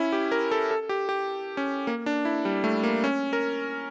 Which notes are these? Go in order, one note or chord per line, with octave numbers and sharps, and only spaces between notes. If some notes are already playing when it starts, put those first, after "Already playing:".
Already playing: C#4 E4
G4
A#4
A4
A4
G4
G4
C#4
A#3
D4
E4
G3
A3
A#3
C#4
A#4